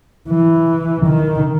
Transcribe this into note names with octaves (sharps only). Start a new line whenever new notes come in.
E3
D#3